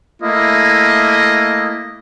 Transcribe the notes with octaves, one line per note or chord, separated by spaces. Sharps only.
A3 A#3 E4 D#5